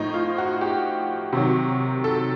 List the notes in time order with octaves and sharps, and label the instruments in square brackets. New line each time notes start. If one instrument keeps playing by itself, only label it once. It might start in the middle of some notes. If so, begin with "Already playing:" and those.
Already playing: [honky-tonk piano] A2 F3 D#4
F4
F#4
G4
C3 D#3 F#3
A4